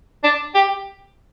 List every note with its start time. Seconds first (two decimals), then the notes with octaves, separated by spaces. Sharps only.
0.24 D4
0.55 G4